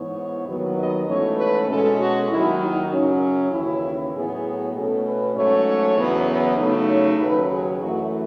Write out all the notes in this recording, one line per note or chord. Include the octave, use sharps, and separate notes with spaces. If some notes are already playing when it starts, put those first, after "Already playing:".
Already playing: G#2 E3 B3 D#4 C#5
D#2 D#3 F#3 B3
D#5
G#2 E3 A3 C#4 C#5
B4
B2 G#3 C#4 A4
F#4
D#2 D#3 F#3 E4
D#4
F#2 C#3 F#3 C#4
D#2 C#3 E3 E4
A2 F#3 B3 G#4
B2 A3 C#4 A4
B4
G#2 F#3 A3 C#4 C#5
E2 C#3 F#3 B3
B4
C#3 F#3 A3 D#4
C#5
D#2 C#3 F#3 B4
G#4
F#2 E3 A3 F#4